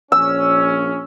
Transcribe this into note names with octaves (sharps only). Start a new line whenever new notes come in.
A#1 C#4 E6